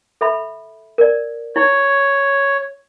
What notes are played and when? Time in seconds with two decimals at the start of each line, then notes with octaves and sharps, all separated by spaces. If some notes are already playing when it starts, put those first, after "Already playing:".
0.21 A4 E5 B5
0.98 A#4 D5
1.56 E4 C#5